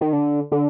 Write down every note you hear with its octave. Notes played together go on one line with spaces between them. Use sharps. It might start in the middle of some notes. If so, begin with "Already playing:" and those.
D#3
D3
D3